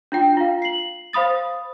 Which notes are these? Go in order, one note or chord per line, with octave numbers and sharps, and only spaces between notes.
D4 F4 G5
F4 F5
C7 F#7
C5 F5 B5 D#6 A6